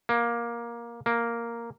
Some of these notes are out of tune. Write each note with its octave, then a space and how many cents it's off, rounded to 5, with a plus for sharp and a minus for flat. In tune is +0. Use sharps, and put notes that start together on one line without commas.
A#3 +15
A#3 +0